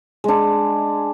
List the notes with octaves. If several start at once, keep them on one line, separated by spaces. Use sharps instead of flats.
G#3 D4